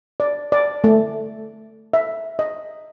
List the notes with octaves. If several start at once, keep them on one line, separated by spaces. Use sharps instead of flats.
D5
D5
A3
E5
D#5